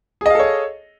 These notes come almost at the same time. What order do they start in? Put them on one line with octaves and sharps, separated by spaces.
G#4 D#5 F5 A4 C#5